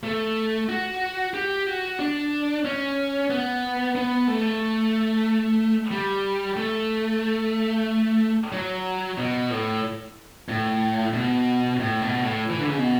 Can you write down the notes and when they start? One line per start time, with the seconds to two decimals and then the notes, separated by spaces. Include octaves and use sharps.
0.03 A3
0.69 F#4
1.34 G4
1.67 F#4
1.99 D4
2.65 C#4
3.30 B3
3.96 B3
4.28 A3
5.91 G3
6.57 A3
8.53 F#3
9.18 B2
9.50 A2
10.49 A2
11.14 B2
11.80 A2
12.02 B2
12.23 A2
12.50 E3
12.59 D3
12.68 C#3
12.78 B2